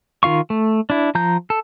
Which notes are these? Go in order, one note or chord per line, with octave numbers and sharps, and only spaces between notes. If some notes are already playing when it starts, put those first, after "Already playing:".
D#3 F4 F5 C#6
A3
D4 E4
F3 A#5 G6
A4